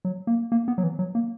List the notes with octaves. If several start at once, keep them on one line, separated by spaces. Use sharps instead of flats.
F#3
A#3
A#3
B3
F#3
E3
F#3
A#3